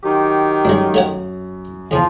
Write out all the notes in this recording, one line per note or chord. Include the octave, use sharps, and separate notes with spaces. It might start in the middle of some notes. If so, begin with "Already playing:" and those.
D#3 F#3 G4
F#2 G#3 D4
A3 C#5 F#5
E2 C#3 F3